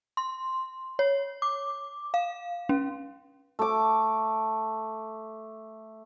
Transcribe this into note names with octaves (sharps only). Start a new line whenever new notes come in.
C6
C#5
D6
F5
C#4
A3 D6